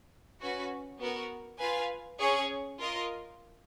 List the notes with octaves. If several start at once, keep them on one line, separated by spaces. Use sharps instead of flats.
C#4 F#4 B4
B3 F#4 A#4
F4 B4 F5 G#5
C#4 G#4 C#5
F4 A#4 D#5